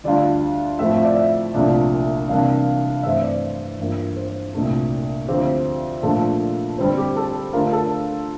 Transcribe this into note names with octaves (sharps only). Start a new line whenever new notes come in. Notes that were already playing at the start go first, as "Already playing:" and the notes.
D2 D3 G3 D4 F4 D5
A2 F3 A3 C4 E5
E5
D5
E5
C2 A#2 F3 A3 D4 D5
C3 E3 G3 A#3 D4 F5
G2 E3 A3 C4 E4 E5
D5
G2 E3 A#3 F4
C5
C2 A#2 A3 D4
D2 D3 F3 C4 F4 G4
A#2 F3 A3 D4 A4
D3 G3 C4 C5
G4
A4
D3 A3 D4 F4 A#4
A4